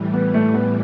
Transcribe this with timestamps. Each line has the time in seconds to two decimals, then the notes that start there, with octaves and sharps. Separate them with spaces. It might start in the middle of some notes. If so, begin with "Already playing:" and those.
Already playing: A2 E3 G3
0.13 B3
0.34 A3
0.54 B3